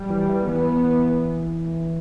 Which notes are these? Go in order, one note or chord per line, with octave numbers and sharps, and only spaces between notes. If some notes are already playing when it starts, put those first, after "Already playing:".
Already playing: G3
E3
E3
E3 B3